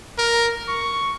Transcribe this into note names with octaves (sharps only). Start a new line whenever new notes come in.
A#4
C#6